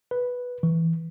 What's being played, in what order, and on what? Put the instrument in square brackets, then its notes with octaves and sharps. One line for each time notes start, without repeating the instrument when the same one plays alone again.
[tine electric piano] B4
E3